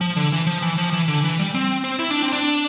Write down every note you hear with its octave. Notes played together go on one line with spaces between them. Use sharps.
F3
D3
E3
F3
E3
F3
E3
D3
E3
G3
C4
C4
E4
D4
C4
D4